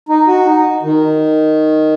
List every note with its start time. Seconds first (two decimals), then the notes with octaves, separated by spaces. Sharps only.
0.09 D#4
0.27 F#4
0.45 D#4
0.83 D#3